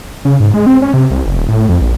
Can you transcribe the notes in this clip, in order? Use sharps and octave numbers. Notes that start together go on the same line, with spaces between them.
C#3
G#2
G#3
C4
C#4
C3
C2
F#1
D#1
A2
F2
A#1